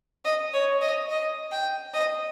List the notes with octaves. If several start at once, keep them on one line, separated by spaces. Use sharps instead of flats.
D#5
C#5
D#5
D#5
G5
D#5